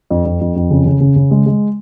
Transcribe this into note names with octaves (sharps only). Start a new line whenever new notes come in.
F2
F2
F2
F2
C#3
C#3
C#3
C#3
G#3
G#3